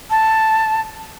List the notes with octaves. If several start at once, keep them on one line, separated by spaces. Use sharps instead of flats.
A5